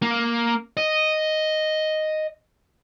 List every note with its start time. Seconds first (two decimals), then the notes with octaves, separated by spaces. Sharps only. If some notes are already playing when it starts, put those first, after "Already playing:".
0.02 A#3
0.77 D#5